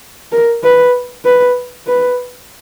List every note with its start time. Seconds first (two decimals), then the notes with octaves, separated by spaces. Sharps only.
0.32 A#4
0.64 B4
1.25 B4
1.87 B4